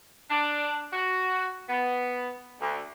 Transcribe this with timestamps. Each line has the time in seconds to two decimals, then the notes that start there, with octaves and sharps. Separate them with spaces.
0.30 D4
0.93 F#4
1.69 B3
2.61 D2